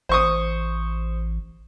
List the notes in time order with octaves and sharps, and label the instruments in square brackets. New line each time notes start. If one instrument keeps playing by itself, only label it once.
[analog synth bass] A1 [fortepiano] C5 C#6 D#6